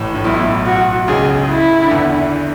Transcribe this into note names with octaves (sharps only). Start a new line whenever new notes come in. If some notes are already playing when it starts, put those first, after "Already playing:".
Already playing: A1 A2
A2
B1 B2 E4
F#4
C#2 C#3 G#4
E4
D3
E2 E3